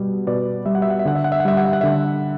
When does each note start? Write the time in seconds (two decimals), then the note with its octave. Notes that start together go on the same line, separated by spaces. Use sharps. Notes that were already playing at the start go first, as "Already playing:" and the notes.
Already playing: B2 G3
0.27 B2 B4 D5
0.66 G3 E5
0.75 F#5
0.82 E5
0.90 F#5
0.99 E5
1.05 D3 F#5
1.15 E5
1.24 F#5
1.32 E5
1.40 F#5
1.45 G3 E5
1.57 F#5
1.65 E5
1.73 F#5
1.81 D3 E5